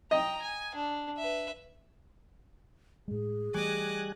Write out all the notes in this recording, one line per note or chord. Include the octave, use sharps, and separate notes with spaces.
D#5 G5 A#5
G#5
D4
B4 E5
A2 G#3 G#4
E3 G3 A3 D#5 G#5 D6 F#6